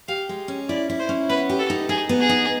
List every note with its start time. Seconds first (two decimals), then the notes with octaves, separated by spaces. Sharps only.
0.08 G4 F5
0.29 G#3
0.48 C#4
0.69 E4 D5
0.90 E4
0.99 C5
1.09 C#4
1.29 B3 B4
1.50 G4
1.59 A4
1.70 D#4
1.89 D#4 G#4
2.09 B3
2.20 G#4
2.29 D#4